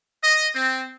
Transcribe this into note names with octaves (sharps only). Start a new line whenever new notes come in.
D#5
C4